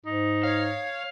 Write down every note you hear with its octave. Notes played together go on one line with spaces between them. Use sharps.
G#2 D#4
C#5 F5